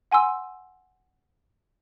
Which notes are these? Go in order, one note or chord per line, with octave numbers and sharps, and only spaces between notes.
F#5 G#5 C6 E6